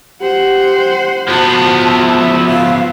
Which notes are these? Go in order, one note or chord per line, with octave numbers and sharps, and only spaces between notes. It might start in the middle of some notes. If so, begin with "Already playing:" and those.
G4 C5 F#5
F3 B3 F#4 A5
E5
F5